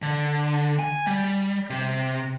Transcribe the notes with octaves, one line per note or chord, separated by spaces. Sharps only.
D3
G#5
G3
C3